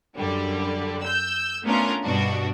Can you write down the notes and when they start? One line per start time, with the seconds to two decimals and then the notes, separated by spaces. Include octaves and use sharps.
0.16 F#2 D3 G3
1.03 E6 G6
1.64 A3 B3 C#4 D4 F4 A#4
2.04 G2 B2 B3 D4 F#4